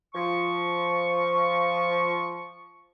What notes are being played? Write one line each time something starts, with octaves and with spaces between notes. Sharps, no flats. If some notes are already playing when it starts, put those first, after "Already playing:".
F3 C#6